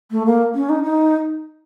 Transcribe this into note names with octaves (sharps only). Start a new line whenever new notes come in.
A3
A#3
C#4
D#4
D#4